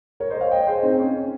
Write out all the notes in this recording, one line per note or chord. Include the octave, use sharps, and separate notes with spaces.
A#4 C#5
C5 D#5
C#5 F5
D#5 G5
G#4 C5
C4 D#4
C#4
C#4